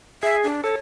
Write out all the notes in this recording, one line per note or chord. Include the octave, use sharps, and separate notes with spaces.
G#4 E5
D4
A4 C#5